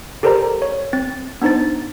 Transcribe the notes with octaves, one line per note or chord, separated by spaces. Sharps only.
G4 A4 A#4 C5 D5 A#5
C#5
C4 A6
B3 D4 D#4 C5 A6